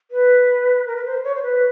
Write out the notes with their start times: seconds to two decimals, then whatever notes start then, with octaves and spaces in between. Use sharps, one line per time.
0.11 B4
0.87 A#4
0.96 B4
1.06 C5
1.24 C#5
1.35 C5
1.43 B4